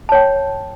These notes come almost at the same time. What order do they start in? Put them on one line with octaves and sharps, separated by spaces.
A5 C#5 G5